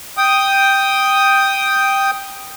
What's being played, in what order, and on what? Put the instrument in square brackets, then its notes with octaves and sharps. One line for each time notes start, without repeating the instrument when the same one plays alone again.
[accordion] G5 D#6